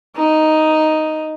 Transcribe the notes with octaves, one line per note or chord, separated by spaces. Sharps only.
D#4